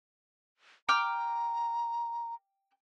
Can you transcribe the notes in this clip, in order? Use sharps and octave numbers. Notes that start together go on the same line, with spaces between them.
G5 A#5 D6 F6